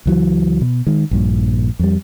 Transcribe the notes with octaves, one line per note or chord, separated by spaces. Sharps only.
C#2 E3 F#3
B2
D#3 G#3
A#1 G2 A#2
F2 G3